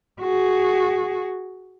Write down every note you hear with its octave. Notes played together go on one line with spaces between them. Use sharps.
F#4 G#4